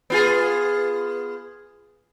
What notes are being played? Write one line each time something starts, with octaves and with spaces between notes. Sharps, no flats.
B3 F4 G#4